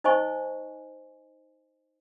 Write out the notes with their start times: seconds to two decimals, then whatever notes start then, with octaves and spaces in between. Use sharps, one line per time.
0.04 D#4 C5 D#5 G#5 C#6